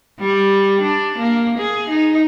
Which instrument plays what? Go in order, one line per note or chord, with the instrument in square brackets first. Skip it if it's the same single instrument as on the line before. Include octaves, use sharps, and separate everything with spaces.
[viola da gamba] G3
D4
A#3
G#4
D#4